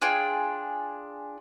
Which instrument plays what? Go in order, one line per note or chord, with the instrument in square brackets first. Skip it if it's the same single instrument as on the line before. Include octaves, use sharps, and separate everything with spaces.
[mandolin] D4 F4 G#4 G5